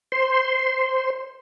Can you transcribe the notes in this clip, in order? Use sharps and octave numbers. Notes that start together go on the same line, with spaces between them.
C5 C6